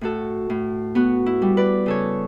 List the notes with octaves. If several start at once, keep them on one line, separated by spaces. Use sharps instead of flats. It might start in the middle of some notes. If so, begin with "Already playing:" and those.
A2 F#4 A4
A2
B3 F#4
E4
G3
B4 D5
C#3 A4 C#5